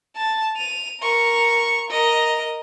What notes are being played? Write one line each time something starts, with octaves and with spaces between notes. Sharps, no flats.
A5
D#7 F7
A#4 C#6
A#4 D#5